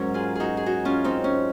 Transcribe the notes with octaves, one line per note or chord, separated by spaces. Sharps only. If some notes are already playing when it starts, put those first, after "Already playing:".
Already playing: G#2 F#3 C#4 A#4
F4 G#4
D#4 F#4 G#4
G#4
D#4 F#4
C#4 F4
C4 D#4
C#4